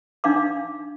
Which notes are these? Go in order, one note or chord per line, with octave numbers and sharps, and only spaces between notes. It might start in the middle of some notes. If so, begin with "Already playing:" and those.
D4 D#4 F5 D6